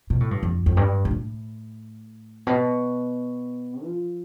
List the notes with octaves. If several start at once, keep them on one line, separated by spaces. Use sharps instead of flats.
B2
A2
G2
F2
F2
G2
G2
A2
B2
F3